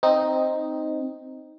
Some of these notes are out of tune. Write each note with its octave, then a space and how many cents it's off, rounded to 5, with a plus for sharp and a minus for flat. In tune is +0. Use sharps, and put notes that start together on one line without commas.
C4 +0 D#4 +0